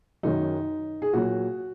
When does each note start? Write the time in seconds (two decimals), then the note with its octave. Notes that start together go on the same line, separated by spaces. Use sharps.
0.23 F#2 D#3 F#3 D#4
1.02 G#4
1.13 A#2 F#3 F#4